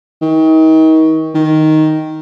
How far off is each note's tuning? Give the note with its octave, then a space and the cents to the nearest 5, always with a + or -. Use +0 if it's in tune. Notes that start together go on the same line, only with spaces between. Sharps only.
D#3 +35
D#3 +0